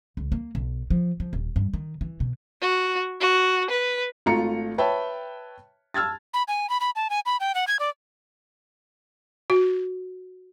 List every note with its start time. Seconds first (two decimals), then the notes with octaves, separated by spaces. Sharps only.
0.17 C#2
0.32 A#3
0.55 B1
0.90 F3
1.20 F3
1.33 D#1
1.56 G2
1.73 D#3
2.01 E3
2.20 B2
2.61 F#4
3.21 F#4
3.70 B4
4.26 G#1 A3 F4 A#5 C#7
4.78 B4 C#5 E5 G5 A5
5.94 A5 E6 F6 G#6 A6
6.34 B5
6.48 G#5
6.70 B5
6.81 B5
6.96 A5
7.10 G#5
7.26 B5
7.40 G5
7.55 F#5
7.68 G#6
7.80 D5
9.50 F#4